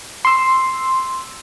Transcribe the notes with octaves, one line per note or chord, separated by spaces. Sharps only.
C6 E6